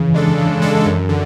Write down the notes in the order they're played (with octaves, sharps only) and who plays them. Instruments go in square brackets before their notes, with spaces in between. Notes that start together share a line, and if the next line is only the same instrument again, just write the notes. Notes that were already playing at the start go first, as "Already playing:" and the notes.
Already playing: [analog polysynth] C#3 [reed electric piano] E3
[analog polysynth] G#3 D4 A4
C#3
G#3 D4 A4
F#2
D3